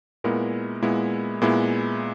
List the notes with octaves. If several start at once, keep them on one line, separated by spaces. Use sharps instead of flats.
A#2 G#3 B3 E4 A#4
A#2 G#3 B3 E4
A#2 G#3 B3 E4